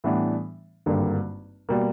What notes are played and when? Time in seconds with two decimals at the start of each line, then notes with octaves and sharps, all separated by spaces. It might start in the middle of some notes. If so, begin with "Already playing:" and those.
0.04 A2 E3 G3 B3 D4
0.86 G#1 G2 D3 G3 A#3
1.69 B2 G3 A#3